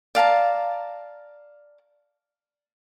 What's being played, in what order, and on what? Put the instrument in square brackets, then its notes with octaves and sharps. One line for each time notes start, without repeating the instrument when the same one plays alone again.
[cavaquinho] D5 F5 A5 A#5